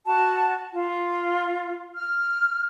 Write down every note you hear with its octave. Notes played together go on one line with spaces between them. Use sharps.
F#4 A5
F4
F6